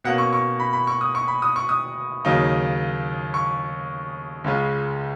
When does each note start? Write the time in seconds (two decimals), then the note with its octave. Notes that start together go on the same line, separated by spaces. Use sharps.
0.04 B2 A#3 C#4 F#5
0.18 C#6
0.33 C#6
0.60 B5
0.73 B5
0.87 C#6
1.01 D#6
1.15 C#6
1.28 B5
1.42 D#6
1.56 C#6
1.69 D#6
2.25 D#2 C#3 F#3 A#3 D#4
3.34 C#6
4.44 C#2 C#3 G#3 C#4 F4